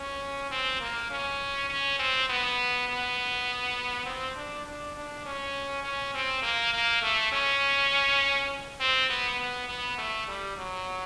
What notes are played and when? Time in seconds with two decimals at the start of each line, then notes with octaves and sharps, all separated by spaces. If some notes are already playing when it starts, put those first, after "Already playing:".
Already playing: C#4
0.51 C4
0.81 A#3
1.11 C#4
1.70 C#4
1.99 C4
2.29 B3
2.89 B3
4.06 C4
4.36 D4
4.66 D4
4.96 D4
5.25 C#4
5.84 C#4
6.14 C4
6.43 A#3
6.73 A#3
7.02 A3
7.33 C#4
8.80 C4
9.10 B3
9.40 B3
9.68 B3
9.98 A3
10.28 G3
10.57 F#3